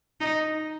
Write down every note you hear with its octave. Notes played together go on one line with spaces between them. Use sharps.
D#4